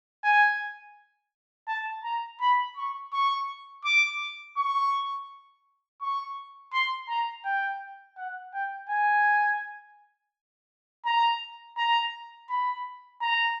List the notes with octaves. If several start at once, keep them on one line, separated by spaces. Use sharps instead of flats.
G#5
A5
A#5
B5
C#6
C#6
D6
C#6
C#6
C6
A#5
G5
F#5
G5
G#5
A#5
A#5
B5
A#5